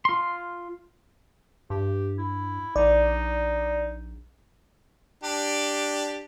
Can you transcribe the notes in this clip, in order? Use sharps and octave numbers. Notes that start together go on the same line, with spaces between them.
F4 C6
G2 G4
E4
A#1 D#4 D5
D4 G4